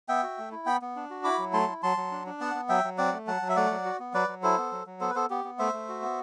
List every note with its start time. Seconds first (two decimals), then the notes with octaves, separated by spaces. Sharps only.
0.09 B3 E5 G5
0.23 F#4
0.38 A3
0.51 E4
0.66 B3 G5 B5
0.82 B3
0.96 D4
1.10 F#4
1.24 E4 B5 D6
1.39 F#3
1.53 A3 A5 C6
1.67 E4
1.83 F#3 A5 C6
1.97 F#3
2.11 D4
2.26 D4
2.40 B3 F#5 A5
2.55 B3
2.69 F#3 E5 G5
2.84 F#3
2.98 C4 D5 F#5
3.13 A3
3.27 F#3 F#5 A5
3.41 F#3
3.49 E5
3.56 A3 D5 F#5
3.71 F#3
3.85 F#4
4.00 B3
4.13 F#3 B4 D5
4.28 F#3
4.43 E4 A4 C5
4.58 B3
4.72 F#3
4.86 F#3
5.00 B3 A4 C5
5.10 B4
5.15 B3 A4 C5
5.30 B3 G4
5.44 B3
5.59 A3 C5 E5
5.73 A3
5.88 F#4
6.02 B3